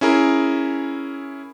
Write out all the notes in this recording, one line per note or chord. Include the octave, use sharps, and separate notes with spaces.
C#4 E4 G#4 A#4